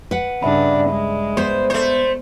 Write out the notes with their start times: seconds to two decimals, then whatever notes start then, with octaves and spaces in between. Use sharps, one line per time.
0.11 B4 F#5
0.43 G2 C#3 D4 D5 E5 B5
0.90 G#3
1.37 B3 C5
1.70 A3 C5